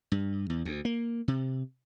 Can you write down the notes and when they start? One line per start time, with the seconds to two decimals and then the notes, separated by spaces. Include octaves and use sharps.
0.12 G2
0.50 E2
0.65 D2
0.85 A#3
1.28 C3